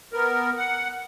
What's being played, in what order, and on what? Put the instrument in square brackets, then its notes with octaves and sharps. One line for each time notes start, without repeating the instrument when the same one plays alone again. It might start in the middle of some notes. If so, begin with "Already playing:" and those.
[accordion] B3 A#4
F#5